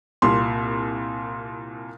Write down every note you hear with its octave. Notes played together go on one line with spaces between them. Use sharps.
C2 A#2 C6